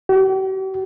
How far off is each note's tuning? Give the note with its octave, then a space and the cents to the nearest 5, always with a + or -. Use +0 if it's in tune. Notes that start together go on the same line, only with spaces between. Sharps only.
G4 -45